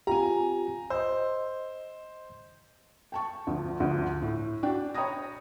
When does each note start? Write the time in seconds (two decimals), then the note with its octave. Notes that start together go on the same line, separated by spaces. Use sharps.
0.07 C4 F4 G4 G#5 A#5
0.90 C5 D#5 E6
3.12 G5 A5 C#6
3.47 D2 F3
3.80 D2 D3 F3
4.22 A2
4.63 D4 F#4 G5
4.94 C#5 G5 A#5 B5 D#6 A#6